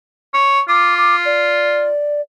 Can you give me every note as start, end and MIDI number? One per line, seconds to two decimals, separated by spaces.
0.34 0.60 73
0.68 1.88 65
0.68 0.94 86
0.98 1.16 86
1.25 2.21 74